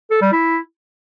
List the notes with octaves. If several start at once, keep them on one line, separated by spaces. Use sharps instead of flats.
A4
G3
E4